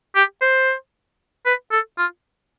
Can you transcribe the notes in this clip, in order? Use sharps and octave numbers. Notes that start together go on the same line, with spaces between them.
G4
C5
B4
A4
F4